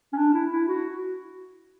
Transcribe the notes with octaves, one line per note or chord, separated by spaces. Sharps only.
C#4
D4
E4
E4
F#4